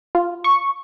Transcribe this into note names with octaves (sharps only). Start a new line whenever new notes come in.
F4
C#6